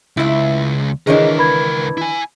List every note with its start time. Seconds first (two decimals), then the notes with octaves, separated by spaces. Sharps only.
0.17 C#2 E4 E5
1.07 C#2 D#3 E3 D4 G#4 A#4 C#5 D#5
1.38 B4 B5 G#6
1.98 E4 G#5